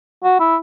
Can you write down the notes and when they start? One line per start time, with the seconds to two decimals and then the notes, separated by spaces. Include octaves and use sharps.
0.24 F#4
0.40 E4